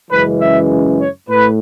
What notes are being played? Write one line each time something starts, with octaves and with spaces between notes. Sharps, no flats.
F#2 C#3 E3 G#3 B4
E5
C#5
A2 B4